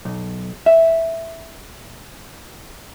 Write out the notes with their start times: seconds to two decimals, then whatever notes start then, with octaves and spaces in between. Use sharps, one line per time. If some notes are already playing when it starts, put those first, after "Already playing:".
0.05 B1
0.66 E5